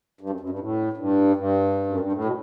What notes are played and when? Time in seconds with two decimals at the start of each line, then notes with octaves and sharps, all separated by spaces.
0.21 G2
0.30 F#2
0.40 F#2
0.50 G2
0.59 A2
0.93 A2
0.97 G2
1.36 G2
1.87 F#2
2.00 G2
2.12 A2
2.25 B2